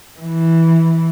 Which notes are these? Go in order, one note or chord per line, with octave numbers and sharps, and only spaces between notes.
E3